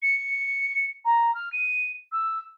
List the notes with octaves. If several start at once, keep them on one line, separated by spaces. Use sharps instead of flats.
C#7
A#5
F6
D#7
E6